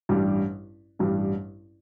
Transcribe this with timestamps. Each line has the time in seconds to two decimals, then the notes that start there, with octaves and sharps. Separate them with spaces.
0.09 A1 G2 G3 D4
0.99 A1 G2 G3 D4